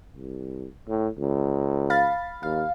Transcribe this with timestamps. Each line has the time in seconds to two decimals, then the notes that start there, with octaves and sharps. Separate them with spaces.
0.16 C2
0.89 A2
1.19 C#2
1.90 F5 B5 A6
2.43 D#2 F5